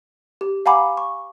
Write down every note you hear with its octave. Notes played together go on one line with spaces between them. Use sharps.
G4
F5 F#5 G#5 A#5 B5 D6
C#6